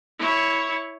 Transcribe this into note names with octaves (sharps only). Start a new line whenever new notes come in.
E4 C#5